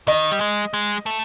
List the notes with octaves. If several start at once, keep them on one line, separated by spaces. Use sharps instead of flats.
D#3 D#5
G3
G#3
G#3
A3